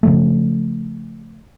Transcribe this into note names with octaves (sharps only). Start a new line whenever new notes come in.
C#3 F3 A3